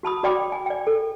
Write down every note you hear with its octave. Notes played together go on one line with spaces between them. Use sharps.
F#4 A5 B5 D#6
F#4 D5 G5 B5 D6
G#5
D5 G5
A4